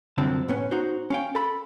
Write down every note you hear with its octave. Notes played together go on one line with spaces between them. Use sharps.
C2 F#2 D3 F3 C4 A5
A2 B3 C#4
D#4 F#4 C5
C#4 F5 G5
A4 B5